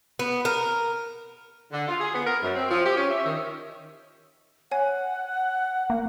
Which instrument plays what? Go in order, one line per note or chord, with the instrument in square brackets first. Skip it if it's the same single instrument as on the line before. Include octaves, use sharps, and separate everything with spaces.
[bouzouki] B3
A#4
[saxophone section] D3
F4
G#4
B3
A#4
F#2
C4
F3
G4
C#4
E5
D#3
[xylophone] C#5 G#5 [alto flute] F#5
[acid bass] A#3